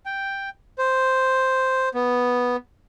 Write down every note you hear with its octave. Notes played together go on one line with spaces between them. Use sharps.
G5
C5
B3